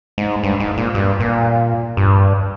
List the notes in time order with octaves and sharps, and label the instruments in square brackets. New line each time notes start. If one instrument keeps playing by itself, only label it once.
[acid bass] G#2
G2
G#2
A#2
G2
A#2
G2